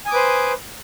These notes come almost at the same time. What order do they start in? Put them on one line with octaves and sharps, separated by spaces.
G#5 D#6 D6 B4 C5